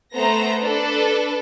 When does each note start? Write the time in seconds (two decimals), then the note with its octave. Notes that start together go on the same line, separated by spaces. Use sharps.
0.15 A3 B3 A4 C5 A#5 A#6
0.63 D4 A4 B4